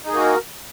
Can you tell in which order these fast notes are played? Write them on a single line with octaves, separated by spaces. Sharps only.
D#4 G#4 A#3 F#4 A#4